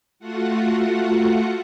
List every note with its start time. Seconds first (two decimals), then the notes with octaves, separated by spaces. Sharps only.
0.19 A3 F4 F#4 F#5